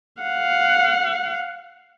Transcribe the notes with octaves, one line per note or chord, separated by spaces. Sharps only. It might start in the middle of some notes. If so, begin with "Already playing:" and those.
F5 F#5